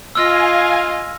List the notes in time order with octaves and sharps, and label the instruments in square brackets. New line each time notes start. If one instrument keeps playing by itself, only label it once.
[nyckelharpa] F4 D#5 [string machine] F5 G#5 [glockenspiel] E6 F6 A#6